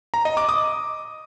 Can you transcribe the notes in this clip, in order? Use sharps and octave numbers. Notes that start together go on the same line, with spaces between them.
A#5
D#5
D6
D#6